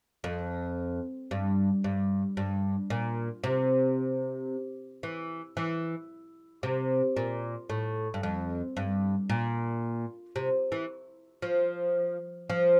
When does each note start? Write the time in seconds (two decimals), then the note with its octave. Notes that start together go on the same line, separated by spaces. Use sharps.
0.24 F2
1.31 G2
1.84 G2
2.37 G2
2.90 A#2
3.44 C3
5.03 E3
5.57 E3
6.63 C3
7.16 A#2
7.70 A2
8.14 G2
8.23 F2
8.77 G2
9.30 A#2
10.36 C3
10.72 E3
11.42 F3
12.50 F3